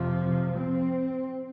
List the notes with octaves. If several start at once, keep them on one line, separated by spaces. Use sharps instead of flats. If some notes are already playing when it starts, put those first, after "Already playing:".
Already playing: F2 C3 F3
C4